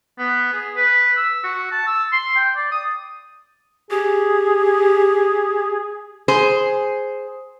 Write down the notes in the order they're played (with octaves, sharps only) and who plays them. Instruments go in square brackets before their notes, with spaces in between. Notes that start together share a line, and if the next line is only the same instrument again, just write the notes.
[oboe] B3
G#4
B4
E6
F#4
A5
E6
C6
G5
D5
D#6
[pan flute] G4 [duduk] G#4
[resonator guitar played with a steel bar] G#4 C5